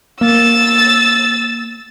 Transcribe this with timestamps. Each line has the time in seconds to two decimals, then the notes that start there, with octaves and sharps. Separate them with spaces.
0.21 A#3 E6 A6